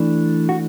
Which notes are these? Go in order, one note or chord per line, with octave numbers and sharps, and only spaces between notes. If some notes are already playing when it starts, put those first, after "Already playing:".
Already playing: E3 A3 D4
F#4